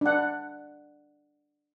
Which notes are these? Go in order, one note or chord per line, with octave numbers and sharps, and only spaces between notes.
D4 F#5